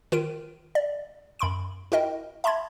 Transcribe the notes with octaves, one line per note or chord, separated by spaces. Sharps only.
D#3 F4 A#4 D7 D#7
D5
F#2 B5 C6 D7
E4 F#4 A#4 D#5 G5
E5 A5 B5 C6 G#6